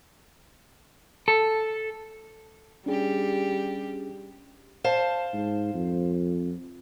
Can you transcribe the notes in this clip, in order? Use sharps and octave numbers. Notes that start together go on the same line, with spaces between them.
A4
G3 C#4 D4 G4 G#4
C5 F5 A5
G#2
F2